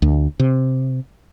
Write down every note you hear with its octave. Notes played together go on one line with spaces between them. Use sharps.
D2
C3